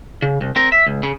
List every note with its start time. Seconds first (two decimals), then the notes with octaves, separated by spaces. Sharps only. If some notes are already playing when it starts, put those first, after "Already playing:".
0.22 C#3
0.41 C2
0.56 C4 A#4
0.72 E5
0.87 C#2
1.03 C#3